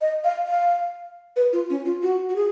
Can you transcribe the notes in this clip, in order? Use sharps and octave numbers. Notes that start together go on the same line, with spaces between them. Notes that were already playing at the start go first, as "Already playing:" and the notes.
D#5
F5
F5
B4
F4
C#4
F4
F#4
F#4
G#4